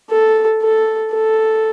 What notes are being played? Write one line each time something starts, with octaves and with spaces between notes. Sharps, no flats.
A4
A4
A4